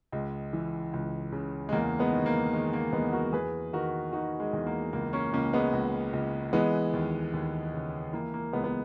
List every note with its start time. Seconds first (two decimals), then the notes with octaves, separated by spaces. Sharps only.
0.12 C#2 G#3
0.53 E3
0.93 C#2
1.32 C#3
1.69 G#3
1.72 E2 A#3
1.99 G#3 B3
2.13 D#3
2.26 A#3
2.53 D#3 G#3
2.73 A#3
2.93 E2 G#3 B3
3.13 F#4 A#4
3.33 E2 G#4 B4
3.73 D#3 F#4 A#4
4.13 D#3 D#4 F#4
4.40 G#3
4.53 E2
4.67 A#3
4.93 C#2 A#3
5.13 A#3 C#4
5.33 C#2 A#3 C#4
5.53 G#3 B3
5.73 C#2
6.13 C#2
6.53 E3 G#3 B3
6.93 D#2
7.33 D#2
7.74 C#3
8.13 E3 A#3
8.34 A#3
8.53 C#2 G#3 B3
8.64 B3